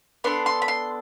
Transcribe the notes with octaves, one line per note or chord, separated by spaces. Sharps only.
B3 D4 A4 C6
C6
B5
C6